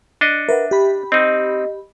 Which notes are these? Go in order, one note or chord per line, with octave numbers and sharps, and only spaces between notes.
D4 D#5 F#6 C#7
A#4 B4 E5 F#5
G4 B5
C4 D#4 D#5